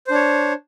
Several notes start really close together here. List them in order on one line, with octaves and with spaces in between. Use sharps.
C5 D4 C#5